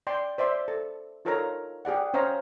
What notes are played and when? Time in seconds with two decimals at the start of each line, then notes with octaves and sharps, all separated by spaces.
0.07 D5 G5 C6
0.38 C5 D5 E5 C6
0.68 A4
1.25 D#4 F4 A4 A#4 C#5 A#5
1.85 G4 G#4 D5 F#5
2.14 C#4 C5 C#5 F5 A#5